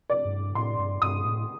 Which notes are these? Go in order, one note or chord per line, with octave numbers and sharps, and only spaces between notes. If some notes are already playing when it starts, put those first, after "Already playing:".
D5
G2
A2 C6
G2
G2 D#6
A2